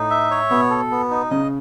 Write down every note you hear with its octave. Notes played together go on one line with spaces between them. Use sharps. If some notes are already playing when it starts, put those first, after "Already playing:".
Already playing: A2 D#4
E5
C#5
B2 B3
A4
B3
D#4
C#3 D#5